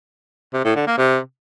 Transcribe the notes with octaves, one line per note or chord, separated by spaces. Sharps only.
C3
A2
D3
A#3
C3